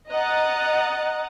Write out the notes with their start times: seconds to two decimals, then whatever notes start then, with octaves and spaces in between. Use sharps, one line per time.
0.11 D#5 F#5 A#5 D#6 F#6 A6